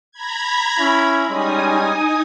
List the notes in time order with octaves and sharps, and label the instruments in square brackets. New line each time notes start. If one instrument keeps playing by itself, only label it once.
[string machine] A#5 B5 G#6
[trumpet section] C#4 E4
[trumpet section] G3 G#3 C#4 [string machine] D#4 G#5 D#6